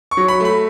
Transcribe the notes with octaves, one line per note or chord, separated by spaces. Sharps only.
C#6
F#3
B5
A3
B5